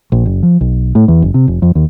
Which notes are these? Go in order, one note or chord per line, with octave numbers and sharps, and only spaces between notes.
A#1
F#1
F3
B1
A2
E2
F#1
C3
F1
F2
D#2